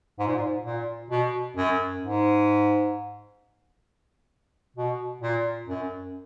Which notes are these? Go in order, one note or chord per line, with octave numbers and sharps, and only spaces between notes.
G#2
A#2
G#2
A#2
B2
F#2
G#2
B2
A#2
F#2